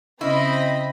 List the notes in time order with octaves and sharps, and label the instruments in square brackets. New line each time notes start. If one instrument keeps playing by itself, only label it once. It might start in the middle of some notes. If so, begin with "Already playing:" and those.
[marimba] C#3 C#4 [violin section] C4 D#5 B5 [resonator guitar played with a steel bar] E4